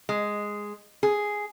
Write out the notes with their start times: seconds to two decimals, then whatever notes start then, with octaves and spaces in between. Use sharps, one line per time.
0.09 G#3
1.03 G#4